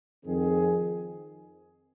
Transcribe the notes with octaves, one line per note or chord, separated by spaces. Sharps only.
F2 D#3 C4 G#4